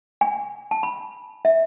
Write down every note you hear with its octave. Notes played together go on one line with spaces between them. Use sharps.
G#5
A5
B5
E5